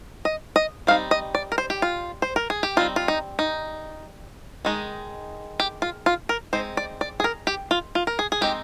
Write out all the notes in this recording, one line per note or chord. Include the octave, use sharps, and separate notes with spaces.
D#5
D#5
G3 C4 D#4 F5
D#5
D5
A#4
C5
G4
F4
C5
A#4
G#4
G4
G3 C4 D#4 F4
F4
D#4
D#4
D#3 G#3 D#4
G4
F4
F4
A#4
G#3 C4 D#4 C5
D5
D5
G#4
A#4
G4
F4
F4
A#4
G#4
G#4
G#3 C4 D#4 G4